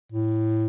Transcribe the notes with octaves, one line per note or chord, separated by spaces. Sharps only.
A2